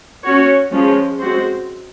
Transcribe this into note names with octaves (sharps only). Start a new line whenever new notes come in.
C#4 F#4 C#5
F3 G#3 C#4
G#3 C4 F#4 C5